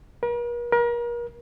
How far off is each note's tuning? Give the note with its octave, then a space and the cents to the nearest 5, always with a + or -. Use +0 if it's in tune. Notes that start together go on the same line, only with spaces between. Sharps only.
A#4 +45
A#4 +35